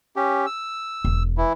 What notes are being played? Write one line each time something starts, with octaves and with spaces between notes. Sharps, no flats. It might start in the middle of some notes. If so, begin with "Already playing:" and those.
C#4 G4
E6
E1
E3 E4